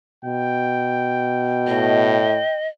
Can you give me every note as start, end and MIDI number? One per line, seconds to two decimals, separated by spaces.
0.25 2.23 47
0.25 2.56 79
1.67 2.39 45
1.67 2.68 75